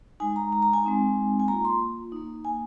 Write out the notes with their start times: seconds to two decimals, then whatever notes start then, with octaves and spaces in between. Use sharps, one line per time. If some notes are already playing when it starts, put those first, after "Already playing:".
0.20 G#3 D#4 G#5
0.36 A#5
0.52 A#5
0.62 A#5
0.73 G#5
0.84 G#3 C4 D#4
1.40 G#5
1.48 A#3 F4 A#5
1.65 C6
2.12 A#3 D#4
2.45 G#5